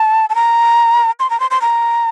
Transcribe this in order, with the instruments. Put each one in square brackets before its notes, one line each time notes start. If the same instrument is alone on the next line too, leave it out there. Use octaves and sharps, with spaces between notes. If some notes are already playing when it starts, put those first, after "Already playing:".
Already playing: [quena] A5
A5
A#5
C6
A#5
C6
C6
A#5